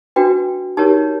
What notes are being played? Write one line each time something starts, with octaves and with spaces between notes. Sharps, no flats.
D4 F#4 B4 G5
D#4 G4 A#4 C#5 A5